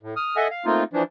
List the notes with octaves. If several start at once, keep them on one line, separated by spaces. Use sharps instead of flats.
A2
D#6 F6
A4 D#5 E5 F#5 G#5
F5
A3 A#3 C4 D#4 F4
E3 F3 D4